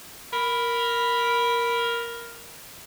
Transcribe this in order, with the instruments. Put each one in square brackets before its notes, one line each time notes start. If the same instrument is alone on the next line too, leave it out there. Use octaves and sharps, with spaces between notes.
[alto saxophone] A#4 [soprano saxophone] B5